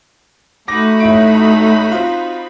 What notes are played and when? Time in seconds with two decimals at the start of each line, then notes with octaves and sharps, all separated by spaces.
0.68 A3 D#4 F#4 B5 D6 A#6
1.00 A1 E4 D7
1.92 C4 F4